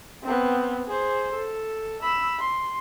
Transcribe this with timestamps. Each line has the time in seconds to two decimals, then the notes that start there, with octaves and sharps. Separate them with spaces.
0.23 B3 C4
0.87 G#4 C5
1.33 A4
2.02 B5 E6
2.40 C6